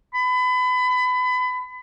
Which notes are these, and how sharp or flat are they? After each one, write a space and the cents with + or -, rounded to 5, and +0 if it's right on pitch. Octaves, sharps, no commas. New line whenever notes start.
B5 +30